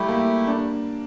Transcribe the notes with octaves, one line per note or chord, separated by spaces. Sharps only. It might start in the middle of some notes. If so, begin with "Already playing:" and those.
Already playing: G3 A3 E4 G4
A#3
D4